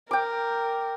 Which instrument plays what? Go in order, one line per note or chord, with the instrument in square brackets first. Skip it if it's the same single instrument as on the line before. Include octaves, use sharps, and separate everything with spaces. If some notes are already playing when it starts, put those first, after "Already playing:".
[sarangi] A#4 [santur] G5 D6